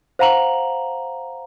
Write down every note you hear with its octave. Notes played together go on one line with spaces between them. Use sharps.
C5 F5 F#5 A#5 F7 F#7